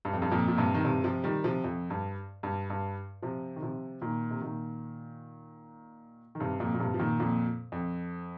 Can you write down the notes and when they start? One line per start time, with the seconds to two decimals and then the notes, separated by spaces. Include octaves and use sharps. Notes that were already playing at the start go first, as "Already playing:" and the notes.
0.05 G2
0.13 F2
0.22 G2
0.31 F2 A#2
0.48 A#2
0.58 G2 C3
0.74 D#3
0.84 G2 C3
1.04 C3 F3
1.24 D#3 G3
1.44 C3 F3
1.64 F2
1.90 G2
2.43 G2
2.70 G2
3.22 C3 F3
3.56 D#3
3.62 C3 F3
4.02 A#2 D#3
4.31 C3
4.41 A#2 D#3
6.35 D#3
6.40 G2 C3
6.60 F2 A#2
6.74 A#2
6.80 G2 C3
6.94 F3
6.99 A#2 D#3
7.20 F2 A#2
7.72 F2